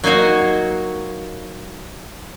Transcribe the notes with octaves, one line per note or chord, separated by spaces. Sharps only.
F#3 A#3 D#4 F#4 D#5